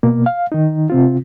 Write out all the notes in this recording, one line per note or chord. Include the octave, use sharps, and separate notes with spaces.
B2 A#3
F5
D#3 D#4
C3 C4 F4